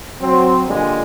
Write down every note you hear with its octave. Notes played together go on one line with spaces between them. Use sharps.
F#3 C4
A#2 D3 G3 G#3